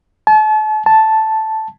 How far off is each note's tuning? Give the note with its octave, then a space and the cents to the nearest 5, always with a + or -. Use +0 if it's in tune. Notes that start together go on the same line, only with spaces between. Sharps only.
A5 -35
A5 +0